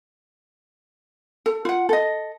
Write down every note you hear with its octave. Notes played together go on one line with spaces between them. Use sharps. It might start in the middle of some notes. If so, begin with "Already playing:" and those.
A4
F4 F#5
A4 D#5